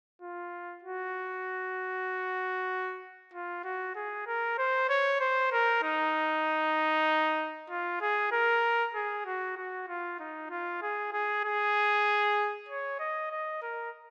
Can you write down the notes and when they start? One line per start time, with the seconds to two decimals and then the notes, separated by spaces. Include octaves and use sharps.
0.22 F4
0.84 F#4
3.33 F4
3.64 F#4
3.95 G#4
4.27 A#4
4.58 C5
4.89 C#5
5.20 C5
5.52 A#4
5.83 D#4
7.70 F4
8.01 G#4
8.32 A#4
8.95 G#4
9.26 F#4
9.57 F#4
9.88 F4
10.20 D#4
10.50 F4
10.82 G#4
11.13 G#4
11.44 G#4
12.69 C#5
13.00 D#5
13.31 D#5
13.62 A#4